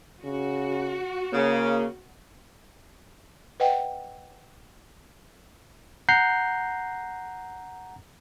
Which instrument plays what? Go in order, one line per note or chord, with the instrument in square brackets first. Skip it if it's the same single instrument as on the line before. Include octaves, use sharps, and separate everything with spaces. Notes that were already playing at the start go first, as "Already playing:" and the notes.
[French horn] C#3 [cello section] F#4
[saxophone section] C#3 [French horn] A#3
[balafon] B4 D#5 F#5 G5
[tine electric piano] F#5 A#5 G6 C7